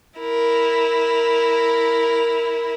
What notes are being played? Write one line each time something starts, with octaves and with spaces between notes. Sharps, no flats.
E4 A#4